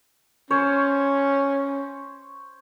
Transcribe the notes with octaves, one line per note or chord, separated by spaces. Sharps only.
C#4 C5 C#5